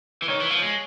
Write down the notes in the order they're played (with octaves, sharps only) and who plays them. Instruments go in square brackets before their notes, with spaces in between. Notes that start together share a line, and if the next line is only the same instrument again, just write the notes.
[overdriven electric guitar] E3
[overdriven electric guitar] D#3 [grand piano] C#5
[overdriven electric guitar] E3
F3
G#3